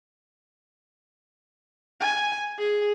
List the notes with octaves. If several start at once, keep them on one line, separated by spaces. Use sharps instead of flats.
G#5
G#4